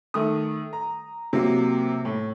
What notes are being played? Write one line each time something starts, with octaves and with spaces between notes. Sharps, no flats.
D#3 A3 D#6
A#5
C3 F#3 A#3
A2